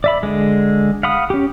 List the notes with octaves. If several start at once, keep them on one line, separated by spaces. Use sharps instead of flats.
D5 E5 B5
D3 G#3
F5 F#5 B5 D#6
C#4 G4